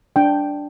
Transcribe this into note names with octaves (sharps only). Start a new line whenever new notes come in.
D4 G5